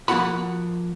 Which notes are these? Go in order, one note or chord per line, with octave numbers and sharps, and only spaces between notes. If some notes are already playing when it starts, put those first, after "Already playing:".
F3 A#3 F4 F#4 F#5 B5